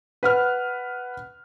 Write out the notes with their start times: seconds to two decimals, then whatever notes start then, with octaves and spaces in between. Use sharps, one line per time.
0.23 B4 F#5 F6